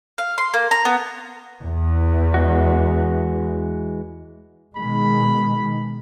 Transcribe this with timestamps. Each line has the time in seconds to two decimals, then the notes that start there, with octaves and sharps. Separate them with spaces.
0.18 F5
0.38 C6
0.54 A#3
0.71 A#5
0.85 B3
1.61 E2
2.34 E3 G#3 F#4
4.76 B2 D#3 G#3 B5